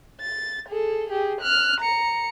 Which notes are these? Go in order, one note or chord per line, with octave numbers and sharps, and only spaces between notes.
A6
G#4 A4
G4 G#4
F6 F#6
A#5 C#7